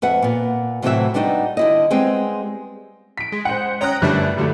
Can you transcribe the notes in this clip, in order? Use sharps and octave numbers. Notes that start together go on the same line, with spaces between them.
F2 B4 E5 F#5
A#2 B3
A2 C3 E3 F#3 F#4 E5
G3 B3 D4 D#4 F4 F#4
D3 E4 D#5
G3 G#3 B3 C4 G4 G#4
B6 D7
G#3
C5 F#5
C#4 G5 A#5 D#6 F#6
G1 F#2 G3 A3 D4 F#6
G2 D3 F#3 G3 A3